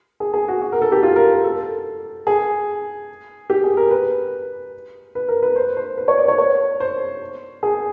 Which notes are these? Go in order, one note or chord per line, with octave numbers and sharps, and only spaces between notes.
G#4
G#4
F#4
F#4
A#4
A4
G4
F4
A#4
A4
G#4
G4
G#4
A#4
B4
B4
A#4
B4
C5
C5
B4
C#5
D5
C#5
C#5
C5
G#4